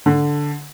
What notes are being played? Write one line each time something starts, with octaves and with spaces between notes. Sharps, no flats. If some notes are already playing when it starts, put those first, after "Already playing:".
D3